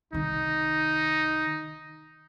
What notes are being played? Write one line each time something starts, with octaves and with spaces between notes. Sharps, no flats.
C2 D#3 D#4